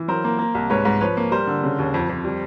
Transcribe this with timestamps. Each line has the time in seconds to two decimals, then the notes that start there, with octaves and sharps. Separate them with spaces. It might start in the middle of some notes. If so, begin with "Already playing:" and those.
Already playing: E3
0.08 F#3 A#4 C5
0.24 A#3
0.39 A#3
0.54 C2
0.70 G#2 B4 C#5
0.85 G#2
1.00 F3 B4 C#5
1.17 A#3
1.31 G3 A#4 C5
1.47 D3
1.63 C#3
1.79 D#2
1.94 F2
2.09 F2
2.24 G3